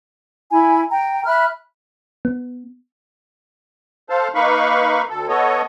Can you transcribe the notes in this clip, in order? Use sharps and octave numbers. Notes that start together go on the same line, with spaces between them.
E4 G#5 B5
G5 A#5
E5 B5 F6 F#6
B3
A4 C5 F5 A5
A#3 D#4 B4 F5 B5 C#6
D2 A4
B3 A4 C#5 D#5